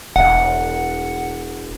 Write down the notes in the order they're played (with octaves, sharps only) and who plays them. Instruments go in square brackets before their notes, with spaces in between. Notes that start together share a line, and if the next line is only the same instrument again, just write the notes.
[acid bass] E1 [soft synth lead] F#5